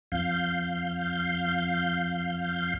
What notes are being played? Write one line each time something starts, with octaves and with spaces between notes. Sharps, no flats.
F2 F5 G6